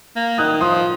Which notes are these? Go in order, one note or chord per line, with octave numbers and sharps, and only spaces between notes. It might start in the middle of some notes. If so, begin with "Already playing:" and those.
A#3
D#3 D#6 F#6
F3 C6 D#6